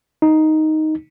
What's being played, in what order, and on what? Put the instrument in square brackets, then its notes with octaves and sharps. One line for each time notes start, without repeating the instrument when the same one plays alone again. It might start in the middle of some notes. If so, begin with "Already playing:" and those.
[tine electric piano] D#4